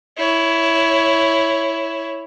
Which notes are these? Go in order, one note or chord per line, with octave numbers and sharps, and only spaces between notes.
E4 C#5